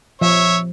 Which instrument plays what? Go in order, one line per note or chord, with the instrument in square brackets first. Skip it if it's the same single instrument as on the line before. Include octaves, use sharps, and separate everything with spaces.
[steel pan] F3 [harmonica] C#5 E5